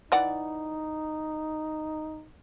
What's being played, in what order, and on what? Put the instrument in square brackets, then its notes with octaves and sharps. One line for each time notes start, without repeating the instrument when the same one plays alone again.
[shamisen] E3 D5 F#5 [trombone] D#4